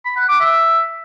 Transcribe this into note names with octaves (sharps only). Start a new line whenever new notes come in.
B5
F#5
D6
E5